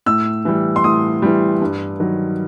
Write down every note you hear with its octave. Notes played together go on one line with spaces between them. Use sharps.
A2 E6
E3 G3
C6
A2 D#6
E3 G3
G2
D#3 F#3